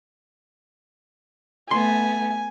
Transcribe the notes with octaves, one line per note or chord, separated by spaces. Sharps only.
A3 B3 G#5 C6